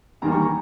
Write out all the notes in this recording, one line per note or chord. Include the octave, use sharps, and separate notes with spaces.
E2 D#3 G3 A#3 A#5
C#6
A#5